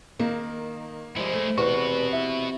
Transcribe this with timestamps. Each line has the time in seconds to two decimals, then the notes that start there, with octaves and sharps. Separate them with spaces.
0.19 D#3 A#3
1.16 F3 G3 G#3 E4
1.33 A3
1.58 E2 C3 E3 F#4 B4 C#6
2.13 E4